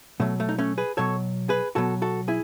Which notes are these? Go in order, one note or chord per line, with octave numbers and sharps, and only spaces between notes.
B2 F#3 A3
A3
D#4
A3 C#4
G#4 B4
B2 F#3 A4 C#5
G#4 B4
B2 F#3 F#4 A4
F#4 A4
E4 G#4